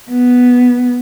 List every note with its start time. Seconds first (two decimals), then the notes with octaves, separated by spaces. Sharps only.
0.10 B3